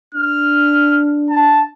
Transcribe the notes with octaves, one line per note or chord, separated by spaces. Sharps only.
D4 F6
A5